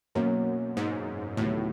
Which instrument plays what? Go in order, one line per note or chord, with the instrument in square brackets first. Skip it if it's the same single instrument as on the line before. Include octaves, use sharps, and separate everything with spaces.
[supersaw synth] F#2 [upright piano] B2 F#3 A#3 C#4
[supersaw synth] G#2
[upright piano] D2 C3 D#3 F#3 B3 [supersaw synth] A2